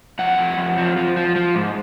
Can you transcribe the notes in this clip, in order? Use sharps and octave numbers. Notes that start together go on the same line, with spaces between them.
F2 F#5
F2
F2
F3
F3
F3
F3
G#2